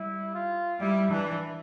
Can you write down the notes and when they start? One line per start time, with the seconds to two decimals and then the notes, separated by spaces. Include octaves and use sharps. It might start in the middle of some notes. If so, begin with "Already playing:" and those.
Already playing: G3 E4
0.35 F4
0.80 G3 E4
1.10 E3 D4